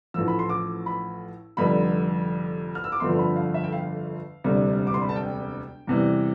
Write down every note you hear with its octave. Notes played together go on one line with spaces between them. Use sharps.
A1 A2 F3 E6
B5
C6
D6
B5
F1 F2 D3 G3 B5
F6
E6
D6
G1 F2 D3 F3 C6
B5
F5
E5
G5
F5
E1 D2 C3 G3
D6
C6
B5
A5
G5
E2 C3 E3 G3